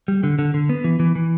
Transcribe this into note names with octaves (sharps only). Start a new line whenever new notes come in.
G3
D3
D3
D3
B3
E3
E3
E3